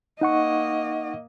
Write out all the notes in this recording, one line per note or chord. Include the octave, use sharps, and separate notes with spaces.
A#3 D#4 D#5 F#5 C#6